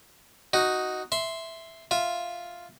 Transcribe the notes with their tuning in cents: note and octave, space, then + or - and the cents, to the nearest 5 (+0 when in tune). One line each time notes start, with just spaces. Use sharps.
D#4 +0 F#4 +0
E5 +0 C6 +0
F4 +0 E5 +0